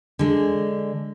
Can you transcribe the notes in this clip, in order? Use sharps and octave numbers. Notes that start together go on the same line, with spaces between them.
D3 G#3